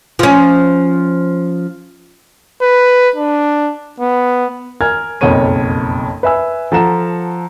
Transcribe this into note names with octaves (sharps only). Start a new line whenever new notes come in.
F3 C#4
B4
D4
B3
A#4 G#5 F6 G#6
F#1 B1 F2 A#4 C#5 D#7
B4 E5 G#5 E6
F3 A4 F#5 A#5 E7